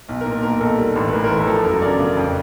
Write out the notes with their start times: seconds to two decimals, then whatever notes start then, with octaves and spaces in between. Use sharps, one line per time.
0.09 B1
0.21 A#4
0.26 A#2
0.32 A#4
0.43 B1 A#4
0.60 B1 A4
0.78 G3
0.96 A1
1.08 B4
1.13 A2 A#4
1.24 A#4
1.30 E3
1.36 A4
1.47 F3 A4
1.65 F#2 A#4
1.82 C#3 D5
1.99 C#3
2.17 F2